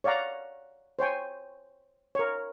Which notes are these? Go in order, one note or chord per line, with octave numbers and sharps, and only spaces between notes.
C#5 D5 F5 F#5 A#5
C5 C#5 G5 G#5
A#4 C#5